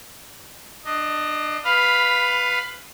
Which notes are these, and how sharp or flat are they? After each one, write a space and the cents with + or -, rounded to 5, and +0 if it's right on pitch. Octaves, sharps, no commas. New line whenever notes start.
D4 +25 D#5 +0
B4 +0 F5 +5 B5 +15